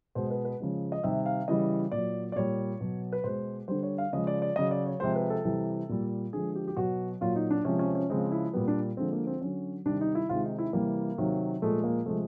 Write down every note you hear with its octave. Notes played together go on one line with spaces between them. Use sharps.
B2 G#3 C5
B4
B4
C#3 F3 G#3
D#5
C3 D#3 G3 E5
F5
C#3 E3 G3 D#5
A#2 F#3 D5
D5
A#2 G3 C#5
B2 F#3
B4
B2 G#3 C5
D3 G3 C5
C#5
F5
C#3 F3 G#3 D#5
D5
D5
C#3 F#3 D#5
D5
C#5
C3 F3 G#3 C5
B4
A4
C3 E3 G3
A#2 G3
D3 F3 G#3 G#4
G4
G4
B2 F#3 F#4
A#2 F#3 F4
D#4
D4
C3 F3 G#3 C#4
C#4
C#4
C#3 F3 G#3 C4
E4
A#2 G3 B3
D4
D3 F3 G#3 C4
A#3
C4
D3 F#3 C#4
C3 D#3 G3 D4
D#4
E4
C3 D#3 G#3 F4
D#4
E4
C3 E3 G3 A#3
C3 D#3 F#3
A#2 F3 G#3 A3
A#3
C3 F3 G#3 A3